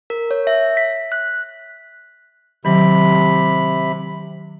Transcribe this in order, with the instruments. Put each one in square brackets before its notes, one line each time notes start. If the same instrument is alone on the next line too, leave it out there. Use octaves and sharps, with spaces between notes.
[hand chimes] A#4
C#5
E5
B6
F#6
[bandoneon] C3 B5 [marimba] D#3 F#3